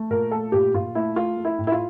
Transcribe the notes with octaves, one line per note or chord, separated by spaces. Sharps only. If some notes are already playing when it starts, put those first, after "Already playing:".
Already playing: A3
A#2 A#4
A3 A4
A#2 G4
A#2 F4
A3 E4
A3 F4
A3
E4
A2
E4
F4